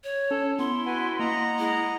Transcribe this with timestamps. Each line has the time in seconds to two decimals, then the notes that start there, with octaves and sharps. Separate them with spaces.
0.04 C#5
0.31 C#4 A4
0.59 B3 E4 C6
0.86 F#4 B4 F#5 G#5
1.20 A#3 D#5 F#5 A#5
1.59 G#3 E4